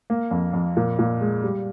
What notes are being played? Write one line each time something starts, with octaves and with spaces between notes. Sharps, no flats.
A#3
F2
F2
A#2
A#2
G#3
G3